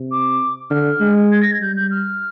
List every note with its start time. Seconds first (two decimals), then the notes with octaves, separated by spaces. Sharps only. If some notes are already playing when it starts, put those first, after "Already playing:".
Already playing: C3
0.11 D6
0.70 D3 F6
1.01 G#3
1.31 G#6
1.41 A#6
1.51 G#6
1.60 G3 G6
1.76 G6
1.91 F6